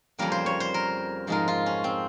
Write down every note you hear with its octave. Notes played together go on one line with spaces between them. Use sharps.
F2 C#3 G3 A#3 A#4
C5
C#5
C5
A#4
G#2 F3 G#3 A#4
F4
C#4
C4